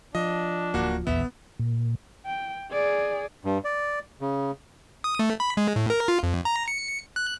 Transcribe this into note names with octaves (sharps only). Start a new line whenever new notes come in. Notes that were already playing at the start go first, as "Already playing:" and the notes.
F3 D4 D#5
D1 A#3 F#4
D#1 A#1 E2 B3 E5
A#2
G5
G#4 D5
G2
D5
C#3
D#6
A3
B5
G#3
A2
A#4
F4
F2
A#5
C#7
F#6